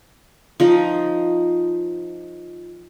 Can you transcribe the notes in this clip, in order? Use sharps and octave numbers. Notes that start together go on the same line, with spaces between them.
F3 D#4 D#5